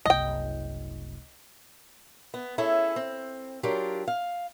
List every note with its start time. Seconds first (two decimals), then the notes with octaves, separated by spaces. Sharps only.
0.06 F#1 C2 D#5 G5
2.34 B3
2.58 C#4 E4 G#4 A4
2.96 C4
3.63 F#3 D4 F4 G4 A#4
4.08 F5